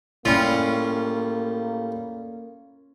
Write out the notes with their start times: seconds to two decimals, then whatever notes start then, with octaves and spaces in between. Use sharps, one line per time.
0.25 A2 G3 A#3 C#4 F4